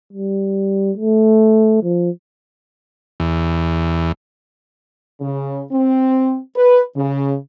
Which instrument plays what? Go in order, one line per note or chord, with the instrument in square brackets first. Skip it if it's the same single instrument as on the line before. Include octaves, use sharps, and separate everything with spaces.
[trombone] G3
A3
F3
[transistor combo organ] E2
[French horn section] C#3
C4
B4
C#3